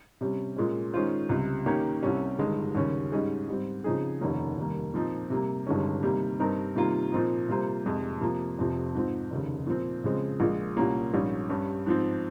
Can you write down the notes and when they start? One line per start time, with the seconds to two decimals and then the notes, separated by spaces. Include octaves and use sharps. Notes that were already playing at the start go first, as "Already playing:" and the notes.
0.21 C3 G3 C#4
0.57 A#2 G#3 C#4
0.93 D#3 G#3 C#4 F4 C5
1.29 C#2 C3 G3
1.66 D#3 A#3 C#4 G4 C#5
2.03 C2 C3 G3 C#4
2.39 G1 G2 D#3 G#3
2.75 D#2 C#3 G3 C#4
3.12 G#2 G3 C#4 G#4 D#5
3.48 G#2 G3 C4
3.84 C#3 F3 C4 D#4 G#4
4.21 F1 D#2 D#3 A#3 C#4
4.57 F1 D#2 D#3 G3 A#3
4.94 A#2 F3 C4 D#4
5.30 C3 G3 A#3
5.67 G1 G2 D#3 G#3 C#4
6.03 C3 D#3 G3 A#3
6.39 G2 G3 C4 D#4 A#4
6.75 C3 D#3 G3 A#3 F4
7.12 A#2 F3 C4 D#4
7.49 C3 G3 A#3 F4 C5
7.85 F1 F2 C3 F3 G#3
8.21 C3 F3 A#3
8.58 F1 F2 C3 F3 C4
8.95 G#2 F3 C4
9.30 F1 D#2 C#3
9.67 A#2 F3 C4
10.04 C#3 F3 G#3 C4
10.40 A#1 A#2 G#3
10.77 C2 A#2 G3 A#3 C#4
11.13 A#1 G#2 G3 C#4
11.49 G2 G3 C#4
11.86 G#2 F3 C4